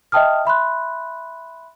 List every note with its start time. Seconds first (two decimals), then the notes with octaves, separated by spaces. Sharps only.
0.12 D#5 E5 G5 A5 D#6 F6
0.45 E5 B5 C6 F#6